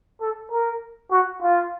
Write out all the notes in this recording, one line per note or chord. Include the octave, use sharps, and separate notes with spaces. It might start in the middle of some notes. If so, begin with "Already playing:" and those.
A4
A#4
F#4
F4